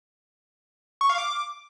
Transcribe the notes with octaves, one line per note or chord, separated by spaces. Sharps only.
C#6
F5
D6